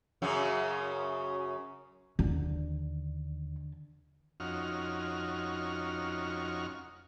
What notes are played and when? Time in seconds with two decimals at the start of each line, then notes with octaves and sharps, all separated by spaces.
0.22 F#2 C#3 F#3
2.19 D#2 D3
4.40 F2 C#4 D#4 F#4 F6